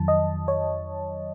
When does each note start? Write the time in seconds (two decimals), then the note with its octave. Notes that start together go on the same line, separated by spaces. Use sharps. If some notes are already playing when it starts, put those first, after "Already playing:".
Already playing: F2 D#3 F#3 A5
0.08 D#5
0.48 C#5